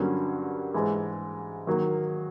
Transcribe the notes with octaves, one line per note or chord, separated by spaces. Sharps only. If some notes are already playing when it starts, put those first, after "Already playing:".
Already playing: G2 D3 F#3 A#3 C#4
G#2 E3 G#3
D#3 F#3 A#3